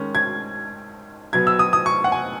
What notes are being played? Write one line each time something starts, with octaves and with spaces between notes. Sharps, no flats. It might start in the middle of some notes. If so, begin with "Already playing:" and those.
Already playing: D#3 G#3 C#4
G#6
B2 F#3 B3 G#6
E6
D#6
D#6
C#6
F#5
G#5